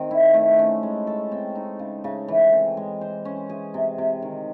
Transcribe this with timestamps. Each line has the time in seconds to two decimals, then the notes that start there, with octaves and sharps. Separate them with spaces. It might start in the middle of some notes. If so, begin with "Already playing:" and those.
Already playing: D#3 C4
0.11 E4
0.34 A3
0.59 C#4
0.83 G#3
1.07 A4
1.32 C4
1.55 D#4
1.79 C#3
2.04 C#3
2.28 E3
2.53 C4
2.77 G#3
3.01 C5
3.25 C#4
3.50 G#4
3.74 C3
3.98 C3
4.22 D#3